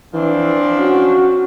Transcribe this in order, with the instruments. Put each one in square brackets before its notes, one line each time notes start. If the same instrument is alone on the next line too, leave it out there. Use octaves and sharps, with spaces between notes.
[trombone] E3 [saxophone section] F3 C4 D4
[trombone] C#4 [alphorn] F#4